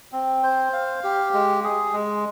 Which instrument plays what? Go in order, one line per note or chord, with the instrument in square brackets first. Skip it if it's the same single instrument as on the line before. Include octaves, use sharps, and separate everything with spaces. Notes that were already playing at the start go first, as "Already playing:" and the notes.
[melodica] C4
C5
F5
G4
G#3
G#4
G#3